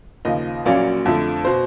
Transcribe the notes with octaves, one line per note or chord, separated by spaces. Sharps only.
D#2 C#3 F3 D#5
A#1 A#2 F#3 A#3 C#4 D5
F2 D3 F3 A3
B2 C5